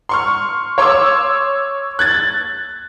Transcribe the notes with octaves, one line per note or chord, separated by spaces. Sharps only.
C6 C#6 F6
C#5 C6 D6 E6
F#6 G#6 A6